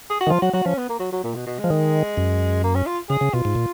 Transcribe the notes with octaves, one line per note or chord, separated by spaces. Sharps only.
G#4
F#4
D#3
F3 F4
F#3 F#4
F#3 F#4
F3 C#4
B3
A#3
F#3
F#3
A#2
B2
B2
F3 G#3
D#3
F#2
A#3
C#4
F4
C#3 G#4
C#3
B2 F4
G#2
A#2